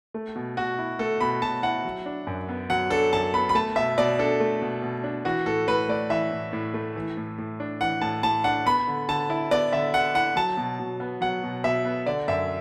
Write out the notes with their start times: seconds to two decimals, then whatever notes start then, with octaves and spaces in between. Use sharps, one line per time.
0.14 A3
0.36 B2
0.57 B2 F#4
0.78 E4
0.99 A3 A4
1.21 B2 B5
1.42 B2 A5
1.63 E4 F#5
1.84 F#3
2.06 D4
2.27 F#2
2.49 B3
2.70 F#3 F#5
2.90 D4 A4
3.13 F#2 A5
3.34 B3 B5
3.49 B5
3.55 A3 A5
3.76 B2 E5
3.98 B2 D5
4.19 D4 A4
4.40 A3
4.62 B2
4.82 B2
5.04 D4
5.25 E3 F#4
5.46 A2 A4
5.68 A2 B4
5.89 A3 D5
6.10 E3 E5
6.31 A2
6.53 A2
6.74 A3
6.96 E3
7.17 A2
7.38 A2
7.60 D4
7.81 E3 F#5
8.01 A2 A5
8.23 A2 A5
8.44 D4 F#5
8.66 B3 B5
8.87 D3
9.08 D3 A5
9.30 E4
9.51 B3 D5
9.72 D3 E5
9.94 D3 F#5
10.15 E4 F#5
10.36 F#3 A5
10.57 B2
10.79 B2
11.00 B3
11.21 F#3 F#5
11.43 B2
11.64 B2 E5
11.85 B3
12.06 D3 D5
12.28 F#2 E5